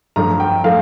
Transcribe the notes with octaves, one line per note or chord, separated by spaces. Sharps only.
G2 F3 A3 A#5
G5
F3 A3 F5